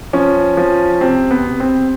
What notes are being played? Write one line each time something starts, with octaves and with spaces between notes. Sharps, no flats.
F3 C#4
F3
C3 C4
B3
C3
C4